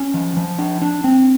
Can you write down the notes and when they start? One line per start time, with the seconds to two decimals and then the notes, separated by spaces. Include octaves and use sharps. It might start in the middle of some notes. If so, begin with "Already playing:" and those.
Already playing: C#4
0.14 F3
0.37 F3
0.58 D4
0.82 D4
1.04 C4